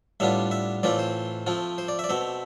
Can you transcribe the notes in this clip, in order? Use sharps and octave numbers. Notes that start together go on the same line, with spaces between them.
A2 G3 B3 D4 F4 E5
E5
A2 E3 A3 C4 F4 D5
C5
F3 A3 C4 F4
C5
D5
E5
D5
B2 A3 C4 E5